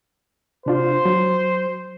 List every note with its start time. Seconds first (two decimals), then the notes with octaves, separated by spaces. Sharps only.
0.66 C3 D4 F4 C5
1.05 F#3